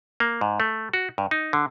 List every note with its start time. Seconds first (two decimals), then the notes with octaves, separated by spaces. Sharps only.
0.20 A#3
0.41 G#2
0.60 A3
0.94 F#4
1.18 G2
1.31 D#4
1.53 D3